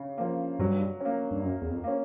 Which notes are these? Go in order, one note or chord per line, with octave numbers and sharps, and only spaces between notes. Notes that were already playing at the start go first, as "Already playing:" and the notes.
Already playing: C#3
F3 A#3
G2 F#3
A#3 C#4
G2
F#2 F#3
E2
F2
A#3 C#4